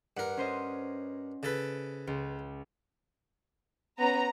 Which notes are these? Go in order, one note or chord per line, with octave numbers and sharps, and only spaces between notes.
G2 A#4 F#5
C#4 C5 D#5
C#3 A4 B4
C#2
B3 C#4 A#5